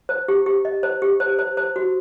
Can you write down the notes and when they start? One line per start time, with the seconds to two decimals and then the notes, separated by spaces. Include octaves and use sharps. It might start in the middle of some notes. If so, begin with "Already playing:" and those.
0.09 C5
0.28 G4
0.46 G4
0.65 D#5
0.83 C5
1.02 G4
1.20 C5
1.39 C5
1.57 C5
1.76 F#4